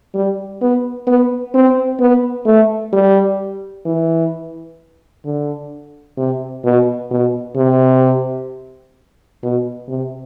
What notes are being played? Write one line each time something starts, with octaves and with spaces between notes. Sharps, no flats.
G3
B3
B3
C4
B3
A3
G3
E3
D3
C3
B2
B2
C3
B2
C3